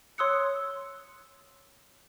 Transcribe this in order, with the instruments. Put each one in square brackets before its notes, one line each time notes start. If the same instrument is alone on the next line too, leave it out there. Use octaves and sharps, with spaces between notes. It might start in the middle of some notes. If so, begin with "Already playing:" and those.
[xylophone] C#5 C6 D#6 E6 F#6 C#7